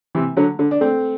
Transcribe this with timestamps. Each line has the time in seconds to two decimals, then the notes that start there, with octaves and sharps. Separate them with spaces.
0.15 C3 E3
0.37 D3 F#3
0.59 D3
0.71 D4
0.81 A3 C4